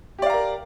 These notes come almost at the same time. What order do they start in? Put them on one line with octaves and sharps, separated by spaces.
G4 D5 F5 A#5 A#4